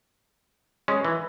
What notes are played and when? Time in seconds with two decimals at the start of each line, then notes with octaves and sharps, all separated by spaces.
0.88 G#3 C#4
1.05 E3